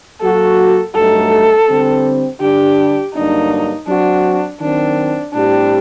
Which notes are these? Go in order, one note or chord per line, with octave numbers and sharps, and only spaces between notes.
F#3 A#3 F#4 A4
G2 F#3 A3 D#4 A4
D3 G3 C4
D3 G3 D4 G4
G2 D3 F#3 A#3 D4 D#4
F#3 C4 D4 F#4
D#3 F#3 C4 D4
A2 G3 C4 D4 G4